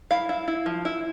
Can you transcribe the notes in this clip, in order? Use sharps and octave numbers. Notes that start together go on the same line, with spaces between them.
E4 F5
E4
E4
F3
E4